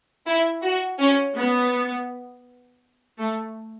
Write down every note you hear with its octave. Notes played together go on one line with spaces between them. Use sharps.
E4
F#4
C#4
B3
A3